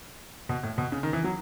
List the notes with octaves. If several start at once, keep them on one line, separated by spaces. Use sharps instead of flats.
B2
A2
B2
C#3
D#3
E3
F#3